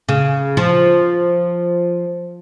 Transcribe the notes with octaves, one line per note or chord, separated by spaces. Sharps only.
C#3
F3